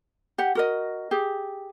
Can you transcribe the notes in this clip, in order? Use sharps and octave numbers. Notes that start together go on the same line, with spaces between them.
G4 F#5
F#4 A#4 D#5
G4 G#4